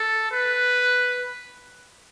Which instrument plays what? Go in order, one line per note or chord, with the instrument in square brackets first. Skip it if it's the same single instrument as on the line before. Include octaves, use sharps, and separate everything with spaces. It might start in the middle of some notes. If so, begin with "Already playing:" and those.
Already playing: [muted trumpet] A4
B4